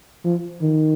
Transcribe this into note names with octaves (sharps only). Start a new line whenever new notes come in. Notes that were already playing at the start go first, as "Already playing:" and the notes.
F3
D#3